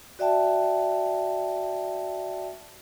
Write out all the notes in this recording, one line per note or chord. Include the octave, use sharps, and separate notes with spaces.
F#4 D5 E5 G5 A5